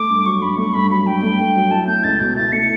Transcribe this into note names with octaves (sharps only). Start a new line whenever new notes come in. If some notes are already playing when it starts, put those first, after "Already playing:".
Already playing: A3 D6
G2
F#3 C#6
G2 B5
A3 C#6
G2 B5
F#3 B5
G2 G5
A3
G2
F#3
E4 A5
A3 G6
C#2 A6
B2 G6
E4 A6
A3 C#7